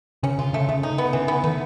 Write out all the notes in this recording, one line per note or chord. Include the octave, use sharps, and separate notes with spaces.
C#3 C#4
C#3 F4
C#3 A3
C#3 A3
D#4
B3
C#3 E3
B3
D#3 A3